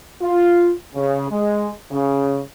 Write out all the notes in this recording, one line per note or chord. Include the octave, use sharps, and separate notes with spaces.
F4
C#3
G#3
C#3